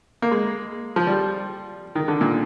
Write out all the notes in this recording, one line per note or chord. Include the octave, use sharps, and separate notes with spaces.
A#3
G#3
F3
G3
D#3
D3
A#2